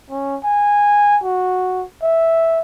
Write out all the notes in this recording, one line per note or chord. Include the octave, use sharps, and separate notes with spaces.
C#4
G#5
F#4
E5